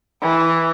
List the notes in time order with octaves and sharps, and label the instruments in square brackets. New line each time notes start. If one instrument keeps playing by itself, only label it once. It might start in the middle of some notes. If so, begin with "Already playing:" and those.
[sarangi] E3